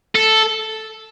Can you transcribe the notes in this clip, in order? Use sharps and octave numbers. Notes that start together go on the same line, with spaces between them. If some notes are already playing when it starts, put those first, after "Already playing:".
A4